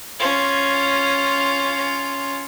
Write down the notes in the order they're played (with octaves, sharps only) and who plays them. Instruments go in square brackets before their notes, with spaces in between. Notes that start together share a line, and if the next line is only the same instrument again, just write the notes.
[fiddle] C#4 F4